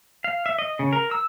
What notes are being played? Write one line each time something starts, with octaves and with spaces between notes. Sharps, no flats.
F5
E5
D#5
C#3
A#4
E6